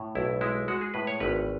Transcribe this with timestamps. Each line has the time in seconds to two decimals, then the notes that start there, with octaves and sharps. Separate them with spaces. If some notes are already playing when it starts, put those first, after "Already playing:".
Already playing: A2
0.15 B1 E4
0.41 G#3 E4
0.68 G#3 F#4
0.81 G#4
0.94 A2 B4
1.07 C#5
1.20 G#1 B4